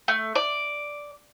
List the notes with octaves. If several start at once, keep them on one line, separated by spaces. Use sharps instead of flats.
A3
D5